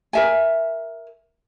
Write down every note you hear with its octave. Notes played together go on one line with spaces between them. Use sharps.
A#4 E5 G#5